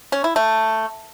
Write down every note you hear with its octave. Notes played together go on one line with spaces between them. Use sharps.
C#4
E4
A3